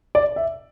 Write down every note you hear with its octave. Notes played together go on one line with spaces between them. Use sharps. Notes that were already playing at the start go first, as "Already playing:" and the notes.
D5
E5